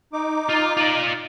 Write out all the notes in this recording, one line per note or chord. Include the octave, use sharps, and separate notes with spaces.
D#4 D6
F4
F4 D5